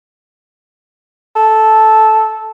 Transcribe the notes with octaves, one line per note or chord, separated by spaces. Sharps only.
A4